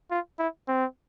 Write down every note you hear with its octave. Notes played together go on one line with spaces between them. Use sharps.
F4
E4
C4